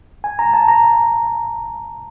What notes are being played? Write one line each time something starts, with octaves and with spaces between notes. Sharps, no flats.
G#5
A#5
A5
A#5